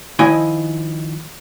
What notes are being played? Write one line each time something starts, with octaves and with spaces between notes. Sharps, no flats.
D#3 F3 E4 D#5 G#5 B5